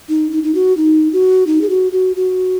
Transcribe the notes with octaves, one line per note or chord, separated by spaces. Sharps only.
D#4
D#4
D#4
F#4
D#4
F#4
D#4
G#4
F#4
F#4
F#4